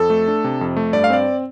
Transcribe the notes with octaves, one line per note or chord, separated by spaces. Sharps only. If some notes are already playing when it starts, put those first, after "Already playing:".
Already playing: F2 A4
A3
D4
C3
F2
A3
G2 D5
F5
C4 D5